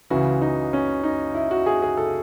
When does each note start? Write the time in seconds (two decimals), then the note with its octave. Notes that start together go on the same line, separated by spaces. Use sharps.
0.10 C#2 C#3 E3 F#4
0.41 D#4
0.73 C#4
1.03 D#4
1.34 E4
1.51 F#4
1.66 G#4
1.82 G#4
1.97 A4